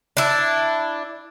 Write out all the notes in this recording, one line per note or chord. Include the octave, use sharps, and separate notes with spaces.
D4 E4